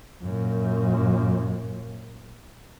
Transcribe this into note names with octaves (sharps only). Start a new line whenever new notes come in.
F#2 A#2